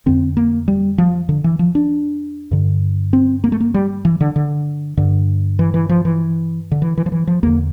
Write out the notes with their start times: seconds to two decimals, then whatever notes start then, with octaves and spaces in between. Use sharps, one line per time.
0.06 F2 D3 C4
0.37 A#3
0.68 G3
0.98 F3
1.29 D3
1.44 E3
1.59 F3
1.75 D4
2.51 G2 D3
3.13 C4
3.44 A#3
3.52 A3
3.60 A#3
3.74 G3
4.05 E3
4.21 D3
4.36 D3
4.97 G2 D3
5.59 E3
5.74 E3
5.89 F3
6.05 E3
6.72 D3
6.82 E3
6.98 E3
7.06 F3
7.12 E3
7.27 F3
7.43 E2 D3 A#3